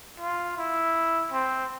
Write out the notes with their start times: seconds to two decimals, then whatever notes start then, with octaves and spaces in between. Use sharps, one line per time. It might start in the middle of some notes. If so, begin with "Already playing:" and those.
0.20 F4
0.58 E4
1.32 C4